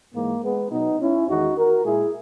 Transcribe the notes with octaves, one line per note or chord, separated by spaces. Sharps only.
G#2 E3 G#3 A#3
G#3 B3
B2 F#3 B3 D#4
C#4 E4
E2 D#3 G#3 D#4 F#4
F#4 A#4
A#2 G#3 E4 G#4